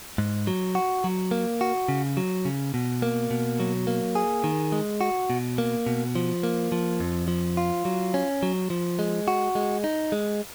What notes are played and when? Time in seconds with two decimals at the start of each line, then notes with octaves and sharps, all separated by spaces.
0.18 G#2
0.47 F#3
0.75 F#4
1.04 F#3
1.31 A#3
1.61 F#4
1.89 C#3
2.17 F#3
2.45 C#3
2.74 B2
3.02 A#3
3.31 B2
3.60 F#3
3.87 A#3
4.15 G#4
4.44 D#3
4.72 G#3
5.01 F#4
5.30 B2
5.58 A#3
5.87 B2
6.15 F3
6.43 A#3
6.72 F3
7.00 F2
7.28 F3
7.57 F4
7.85 F#3
8.14 C#4
8.43 F#3
8.70 F3
8.99 G#3
9.28 F#4
9.55 G#3
9.84 D#4
10.12 G#3